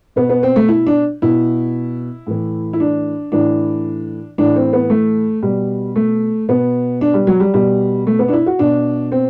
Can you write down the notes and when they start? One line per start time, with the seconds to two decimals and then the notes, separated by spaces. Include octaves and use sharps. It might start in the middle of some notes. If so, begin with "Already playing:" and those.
0.16 B2 B3
0.29 B3
0.43 C4
0.56 A3
0.68 E4
0.87 D4
1.22 B2 E4
2.27 A2 E3
2.73 E4
2.80 D4
3.32 A2 E3 D4
4.38 A2 E3 D4
4.56 C4
4.73 B3
4.90 A3
5.43 B2 G3
5.96 A3
6.49 B2 B3
7.01 D4
7.14 G3
7.27 F#3
7.40 G3
7.54 B2 G3
8.07 A3
8.19 B3
8.28 D4
8.33 E4
8.46 F#4
8.59 B2 D4
9.12 C4